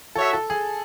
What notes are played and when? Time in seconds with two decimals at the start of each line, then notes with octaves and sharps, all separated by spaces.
0.15 F#4 A4 C#5 E5
0.33 A4
0.50 G#4